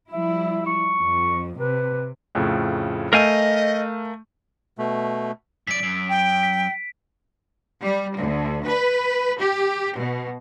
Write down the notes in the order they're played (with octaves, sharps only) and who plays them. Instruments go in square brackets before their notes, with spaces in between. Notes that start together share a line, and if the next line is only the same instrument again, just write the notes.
[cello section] F3 G3 E4 [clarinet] E5
[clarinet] C#6
[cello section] F2
[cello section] C3 [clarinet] B4
[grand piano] F2 A2 C#3
[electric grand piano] A3 [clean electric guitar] A#4 F5 G#5 [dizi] D#5 [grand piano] F6 G6
[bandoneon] B2 A3
[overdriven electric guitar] F#2 D5 [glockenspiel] B6 D7
[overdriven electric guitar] F#2
[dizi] G5
[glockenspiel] B6
[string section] G3
D2
B4
G4
B2